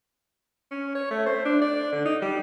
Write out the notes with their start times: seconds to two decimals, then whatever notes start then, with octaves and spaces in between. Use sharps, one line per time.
0.71 C#4
0.95 C#5
1.11 A3
1.26 C5
1.45 D4
1.62 D5
1.92 D3
2.05 D#4
2.22 G3